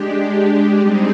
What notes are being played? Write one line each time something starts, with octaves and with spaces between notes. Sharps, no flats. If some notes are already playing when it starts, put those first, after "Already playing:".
Already playing: G#3 D4 G4
G3 C4 D#4 G#4